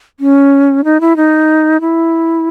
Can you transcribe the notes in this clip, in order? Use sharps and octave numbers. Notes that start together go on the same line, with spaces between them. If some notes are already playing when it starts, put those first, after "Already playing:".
C#4
D#4
E4
D#4
E4